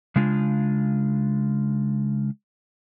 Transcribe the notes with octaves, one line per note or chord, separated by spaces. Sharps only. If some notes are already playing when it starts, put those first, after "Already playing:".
C#3 G#3 D4 F4